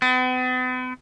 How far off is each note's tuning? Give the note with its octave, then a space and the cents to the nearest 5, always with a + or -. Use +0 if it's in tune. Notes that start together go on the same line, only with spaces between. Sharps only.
B3 +45